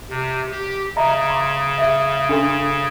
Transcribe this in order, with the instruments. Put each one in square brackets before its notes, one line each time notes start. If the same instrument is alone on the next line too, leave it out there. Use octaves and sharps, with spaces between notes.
[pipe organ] C3
G4
[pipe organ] C#3 [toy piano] D#5 E5 A#5
[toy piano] A#5 C6 D6
G#4 E5
D4 A4 C6